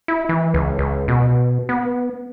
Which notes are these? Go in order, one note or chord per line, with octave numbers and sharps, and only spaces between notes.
E4
E3
C#2
C#2
B2
B3